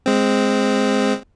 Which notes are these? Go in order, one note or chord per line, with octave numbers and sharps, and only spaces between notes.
G#3 C4